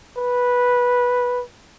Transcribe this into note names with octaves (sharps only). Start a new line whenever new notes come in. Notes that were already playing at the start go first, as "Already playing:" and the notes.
B4